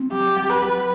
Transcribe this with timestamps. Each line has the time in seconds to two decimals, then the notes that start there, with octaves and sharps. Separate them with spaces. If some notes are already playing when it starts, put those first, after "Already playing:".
Already playing: C4
0.12 F#3 G4
0.37 F#3
0.50 B4
0.63 F#3